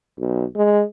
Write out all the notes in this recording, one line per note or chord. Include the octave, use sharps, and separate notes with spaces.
B1
G#3